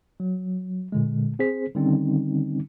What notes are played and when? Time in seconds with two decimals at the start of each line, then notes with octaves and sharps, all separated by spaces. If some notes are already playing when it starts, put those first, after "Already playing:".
0.20 F#3
0.92 A#2 D3 G#3
1.39 C4 G#4 C5 B6
1.75 D3 D#3 G3 C4 C#4 D#4